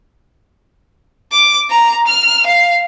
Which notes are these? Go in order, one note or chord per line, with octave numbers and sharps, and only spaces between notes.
D6
A#5
F6
F5